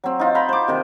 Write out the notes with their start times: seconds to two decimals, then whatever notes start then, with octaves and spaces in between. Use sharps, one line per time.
0.04 F#3 C4
0.19 D#4 F4
0.35 G5 A#5 B5
0.49 C5 D6
0.68 C3 D#3